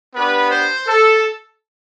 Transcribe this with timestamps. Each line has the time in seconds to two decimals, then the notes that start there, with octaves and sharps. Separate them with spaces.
0.14 B3 D4 G4 B4
0.51 C5
0.87 A4